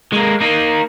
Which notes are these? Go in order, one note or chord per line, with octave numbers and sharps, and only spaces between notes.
G#3 A#3
A#3 D#4